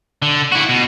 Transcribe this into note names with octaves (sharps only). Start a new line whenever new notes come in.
D3
E4 F#4
B2